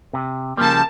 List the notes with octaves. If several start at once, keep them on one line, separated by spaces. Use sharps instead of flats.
C3
C#3 F3 G3 A#3 A5